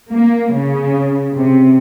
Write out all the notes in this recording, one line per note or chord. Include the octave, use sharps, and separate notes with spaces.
A#3
C#3
C3